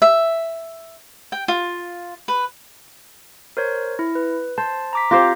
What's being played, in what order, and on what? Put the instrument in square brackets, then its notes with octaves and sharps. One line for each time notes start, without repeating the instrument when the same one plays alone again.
[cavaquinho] E5
G5
F4
B4
[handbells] A#4 C5 C#5
E4
B4
[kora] C5 [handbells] A5
[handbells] A#5 D6 B6
[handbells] C4 A#6 [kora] F4 G4 C5